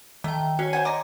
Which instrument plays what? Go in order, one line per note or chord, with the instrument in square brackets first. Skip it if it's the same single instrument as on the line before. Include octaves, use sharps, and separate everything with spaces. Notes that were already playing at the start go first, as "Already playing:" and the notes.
[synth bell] D#3 G5 [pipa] A3
[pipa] C#4 [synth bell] F#4 C#5
[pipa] C5 F#5 G#5
[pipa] D5 D#5 [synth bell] A#5 C6